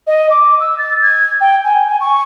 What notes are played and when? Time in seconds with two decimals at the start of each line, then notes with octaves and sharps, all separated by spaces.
0.07 D#5
0.30 D6
0.60 E6
0.78 A6
1.02 G#6
1.41 G5
1.64 G#5
1.87 G#5
2.01 C#6